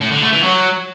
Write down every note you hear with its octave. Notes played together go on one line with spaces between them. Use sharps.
A2
D3
A3
E3
F#3